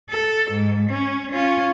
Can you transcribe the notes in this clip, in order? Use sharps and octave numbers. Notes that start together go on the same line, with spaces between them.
A4
G#2
C#4
C#4 F4